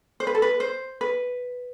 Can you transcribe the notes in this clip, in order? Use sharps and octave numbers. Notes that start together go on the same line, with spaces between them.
C5
B4
A4
B4
C5
B4